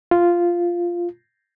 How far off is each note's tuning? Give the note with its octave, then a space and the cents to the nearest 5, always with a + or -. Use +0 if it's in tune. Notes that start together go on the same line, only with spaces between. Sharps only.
F4 -5